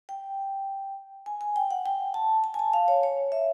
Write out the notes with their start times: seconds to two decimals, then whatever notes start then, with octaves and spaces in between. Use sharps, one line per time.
0.09 G5
1.26 G#5
1.41 G#5
1.56 G5
1.71 F#5
1.86 G5
2.14 A5
2.44 A5
2.54 G#5
2.59 A5
2.73 F5
2.88 C#5
3.03 C#5
3.32 E5